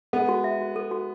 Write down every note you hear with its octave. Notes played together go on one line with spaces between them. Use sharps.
G#3 B3 A4
F#4
E5
F#4
A4
F#4